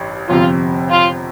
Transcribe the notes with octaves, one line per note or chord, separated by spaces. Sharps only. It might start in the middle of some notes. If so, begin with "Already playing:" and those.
Already playing: A1 G2
G1 F2 C3 F4
F4